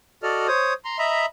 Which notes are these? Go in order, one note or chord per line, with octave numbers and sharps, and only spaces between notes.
F#4 A4 D5 D#5 F6
C5 C#5 D#6
A#5 C6
D#5 E5 A#5 B5